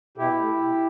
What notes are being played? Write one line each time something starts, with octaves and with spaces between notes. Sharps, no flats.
B2 E4 G4
A3
B2